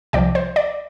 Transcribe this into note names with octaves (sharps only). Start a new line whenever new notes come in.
C2 C3 F3 D5 G5
C5
D5